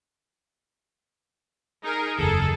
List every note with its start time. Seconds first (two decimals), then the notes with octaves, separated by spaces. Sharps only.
1.84 D#4 G#4 A#4
2.19 F#1 E2 G#4 A4